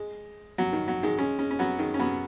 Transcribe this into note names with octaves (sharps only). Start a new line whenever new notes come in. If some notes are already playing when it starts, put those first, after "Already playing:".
Already playing: G#3
F#3
D#3
F#3
D#3 G#3
G#3 C#4
G#3 C#4
C#4
F#3 B3
D#3 G#3
C#4
F#3 B3